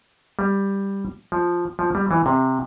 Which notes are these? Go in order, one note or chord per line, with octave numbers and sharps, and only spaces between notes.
G3
F3
F3
G3
E3
C3